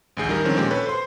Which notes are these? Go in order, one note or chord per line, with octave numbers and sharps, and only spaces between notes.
A1 D2 G#4 G6
D#3 G3 G#4 A#4
D3 D#3 F3 C4 C#4
A#2 G#3 C#4 G4
A4 B4 C#5
C5 C6